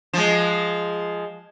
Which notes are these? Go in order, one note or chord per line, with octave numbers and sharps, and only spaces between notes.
F3 G#3